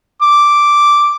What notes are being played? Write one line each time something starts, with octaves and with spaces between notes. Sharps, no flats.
D6